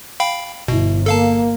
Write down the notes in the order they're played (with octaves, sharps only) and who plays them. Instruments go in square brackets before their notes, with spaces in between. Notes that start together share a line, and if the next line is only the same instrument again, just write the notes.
[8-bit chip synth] F5 G5 B5
[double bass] G1 E4 [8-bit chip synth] B2
[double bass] A#3 [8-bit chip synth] A4 F5 A5